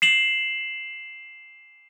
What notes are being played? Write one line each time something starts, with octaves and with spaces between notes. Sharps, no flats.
C7 E7 F#7